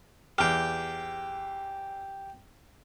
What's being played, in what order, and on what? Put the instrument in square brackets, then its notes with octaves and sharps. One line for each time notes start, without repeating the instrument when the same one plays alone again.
[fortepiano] E2 F6 [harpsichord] G4 G5